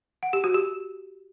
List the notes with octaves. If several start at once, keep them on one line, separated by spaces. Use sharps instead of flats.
F#5
G4
F#4
G4